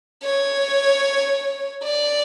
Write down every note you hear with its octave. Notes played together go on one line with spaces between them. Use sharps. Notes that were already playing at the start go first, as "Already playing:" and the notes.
C#5
D5